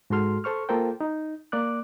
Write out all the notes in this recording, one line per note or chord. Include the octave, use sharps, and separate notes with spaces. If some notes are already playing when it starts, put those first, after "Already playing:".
G#2 F#4 A4 C6 F6
A4 C5 C#6 F6
A#3 F4 A4 A#4 C5 G5
D#4
A#3 D5 D6 F#6